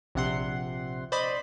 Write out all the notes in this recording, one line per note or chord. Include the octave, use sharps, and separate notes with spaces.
A#1 C3 F#5 C6
C5 D5 D#5 B5